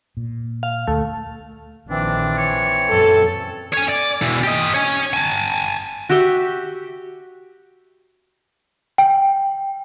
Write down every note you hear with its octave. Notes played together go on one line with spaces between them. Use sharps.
A#2
F5
D2 A3
A#1 D#3 E3 C4 D4
C#5
F#2 A#2 A4
C#5 G#5
D5
B2 E3
G4 D#5
C#5 G#5
G#5 A5
F#4 G4 E5 G5
G5